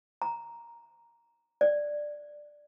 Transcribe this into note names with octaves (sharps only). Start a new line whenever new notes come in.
A#5
D5